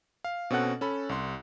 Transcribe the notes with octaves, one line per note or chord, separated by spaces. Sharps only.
F5
B2 C4 C#4 A4 F#5 F#6
C#4 A4 B5
C2 C6